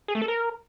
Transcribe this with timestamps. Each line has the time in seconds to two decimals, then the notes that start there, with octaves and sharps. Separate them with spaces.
0.08 G#4
0.15 A3
0.22 A4
0.28 A#4